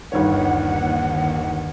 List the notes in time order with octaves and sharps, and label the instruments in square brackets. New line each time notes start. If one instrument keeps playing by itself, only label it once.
[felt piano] G1 D#3 C#5 [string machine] D#2 [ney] F#5